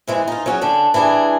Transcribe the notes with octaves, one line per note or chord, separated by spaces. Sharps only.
C3 E3 G#3
D#4 F4
F#3 C#4 G#4
D3 C#4 D4 A4
E3 G3 D4 G#4